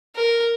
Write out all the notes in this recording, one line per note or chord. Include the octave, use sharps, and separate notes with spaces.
A#4